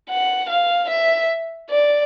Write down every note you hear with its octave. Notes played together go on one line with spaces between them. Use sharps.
F#5
F5
E5
D5